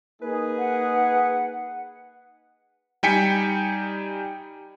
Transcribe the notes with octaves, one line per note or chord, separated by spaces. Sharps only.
A#3 D#4 G#4 B4
F#5
G3 D#4 G5 G#5 B6 C#7